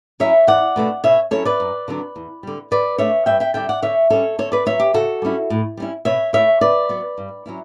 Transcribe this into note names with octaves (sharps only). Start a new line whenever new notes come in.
F#3 C#4 E4 C#5 E5
E2 D5 F#5
B2 A3 D4
B2 C#5 E5
F#3 C#4 E4 A4 C#5
B4 D5
F#2
D3 F#3 B3 D4
E2
D3 G3
D3 B4 D5
A3 D4 C#5 E5
G2 E5 G5
E5 G5
D3 G3 D4 E5 G5
D5 F#5
D3 C#5 E5
G3 C#4 A4 C#5
D3 A4 C#5
B4 D5
F#3 A3 C#5 E5
G4
C#3 F#4 A4
G3 C#4 E4
A2
G3 C#4 E4
B2 C#5 E5
A3 E4 C#5 E5
C#3 B4 D5
F#3 B3
G2
F#3 C#4 E4